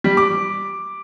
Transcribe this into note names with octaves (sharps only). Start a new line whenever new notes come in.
G3
D6